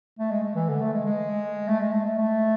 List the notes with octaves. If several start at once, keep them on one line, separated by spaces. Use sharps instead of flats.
A3
G#3
G#3
E3
D3
A3
G#3
G#3
A3
G#3
A3
A3
A3